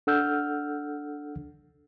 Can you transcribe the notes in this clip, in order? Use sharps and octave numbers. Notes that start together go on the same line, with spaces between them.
D4 A4 F#5 E6 F6 G6